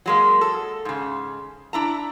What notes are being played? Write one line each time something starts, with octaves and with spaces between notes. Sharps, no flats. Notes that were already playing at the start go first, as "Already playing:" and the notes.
F#3 G#3 A#3
A4
G#2 C#3
D4 E4 A#5